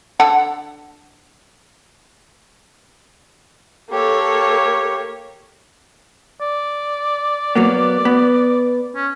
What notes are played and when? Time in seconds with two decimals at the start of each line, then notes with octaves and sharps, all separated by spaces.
0.20 D3 A4 F#5
3.91 A#3 G4 A4 C#5
6.41 D5
7.55 F#3 A#3 B3
8.05 B3
8.95 C#4